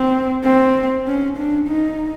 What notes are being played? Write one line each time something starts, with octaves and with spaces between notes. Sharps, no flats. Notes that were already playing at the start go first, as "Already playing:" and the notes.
Already playing: C4
C4
C#4
D4
D#4